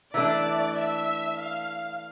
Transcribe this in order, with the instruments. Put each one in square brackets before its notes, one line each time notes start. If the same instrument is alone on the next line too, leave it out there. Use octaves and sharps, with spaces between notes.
[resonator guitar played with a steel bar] E3 A3 D4 [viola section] D5
[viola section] E5
F5